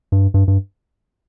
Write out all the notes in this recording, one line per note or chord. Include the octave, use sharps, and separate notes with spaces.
G2
G2
G2